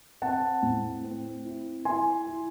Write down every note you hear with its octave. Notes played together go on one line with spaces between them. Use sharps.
C4 F#5 A5
A2
C4
E4
E4 G#5 C6
E4